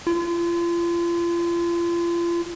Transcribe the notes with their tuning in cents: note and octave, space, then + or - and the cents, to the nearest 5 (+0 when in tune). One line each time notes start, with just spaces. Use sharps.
F4 -35